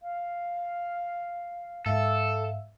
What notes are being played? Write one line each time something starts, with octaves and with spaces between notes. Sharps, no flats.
F5
G#2 A4 E5 F5 E6